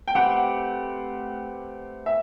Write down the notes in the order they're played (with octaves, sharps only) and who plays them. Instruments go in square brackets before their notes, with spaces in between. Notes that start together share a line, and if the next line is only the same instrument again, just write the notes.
[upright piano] G5
[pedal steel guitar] A3 C4 G4 B4 [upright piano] F#5
[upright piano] E5